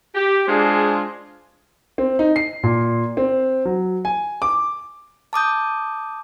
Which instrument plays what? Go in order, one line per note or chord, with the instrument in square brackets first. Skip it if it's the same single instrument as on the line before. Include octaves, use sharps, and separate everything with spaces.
[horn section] G4
G#3 D4 F4 G#4 C5
[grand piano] C4
D#4
C7
A#2
C4
F#3
G#5
D6
[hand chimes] A5 D6 D#6 G6